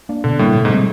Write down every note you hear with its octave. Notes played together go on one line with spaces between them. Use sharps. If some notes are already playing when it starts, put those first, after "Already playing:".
A#3 D4
B2 D3
A2 G3 A#3 D4
B2
G#2
G3 C4